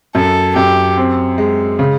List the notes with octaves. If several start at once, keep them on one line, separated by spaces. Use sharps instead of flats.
F#2 A4
F#2 G4
C4
G#3
C#3